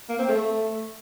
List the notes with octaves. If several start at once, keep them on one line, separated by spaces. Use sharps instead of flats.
A#3
C4
A3